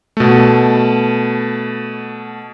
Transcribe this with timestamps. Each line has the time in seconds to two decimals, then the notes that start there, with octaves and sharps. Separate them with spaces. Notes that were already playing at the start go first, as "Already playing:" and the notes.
0.17 B2 A3